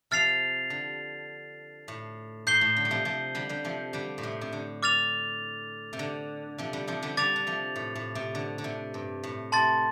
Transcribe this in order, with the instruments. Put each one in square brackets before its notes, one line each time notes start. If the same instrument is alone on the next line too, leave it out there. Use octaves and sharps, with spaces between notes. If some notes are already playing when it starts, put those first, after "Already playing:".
[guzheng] C3 F3 [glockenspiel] F6 A6 C7 F7
[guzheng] D3
A2
[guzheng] A2 [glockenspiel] G6 C7 G7
[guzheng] A2
D3
G3
C3 F3
C3 F3
D3 G3
D3 G3
C3 F3
D3 G3
A2
C3
C3
D3
[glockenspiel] D6 F6 A6 F7
[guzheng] C3
D3
C3 F3
D3 G3
C3 F3
D3 G3
[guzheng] D3 G3 [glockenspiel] D6 A6 F7
[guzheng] D3
C3 F3
A2
A2
C3
D3
D3
C3
G2
A2
[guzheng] C3 [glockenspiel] A5 C6 A6